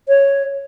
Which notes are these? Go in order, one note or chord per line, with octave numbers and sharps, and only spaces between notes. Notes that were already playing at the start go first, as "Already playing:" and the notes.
C#5